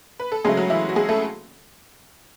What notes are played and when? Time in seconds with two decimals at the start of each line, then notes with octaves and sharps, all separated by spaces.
0.20 B4
0.32 A4
0.44 C#3 F#3 G#3 A3 G#4
0.57 F#3 F#4
0.70 E3 E4
0.89 F#4
0.96 G#3 G#4
1.09 A3 A4